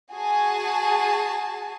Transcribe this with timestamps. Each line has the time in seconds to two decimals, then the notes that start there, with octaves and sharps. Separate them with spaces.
0.14 F#4 G#4 G#5 A5